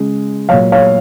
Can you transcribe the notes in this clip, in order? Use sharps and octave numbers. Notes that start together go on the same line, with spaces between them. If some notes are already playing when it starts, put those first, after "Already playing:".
Already playing: C#3 G#3
A#2 F#3 C#5 F5
C#5 F5